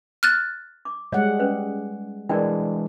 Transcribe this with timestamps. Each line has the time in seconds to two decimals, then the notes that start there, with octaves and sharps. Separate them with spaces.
0.23 F6 F#6 A6
0.85 D6
1.12 G3 G#3 C#5 D#5 F#5
1.39 C#4 B4 C5
2.29 E3 G#3 D4 A#4 D5 G5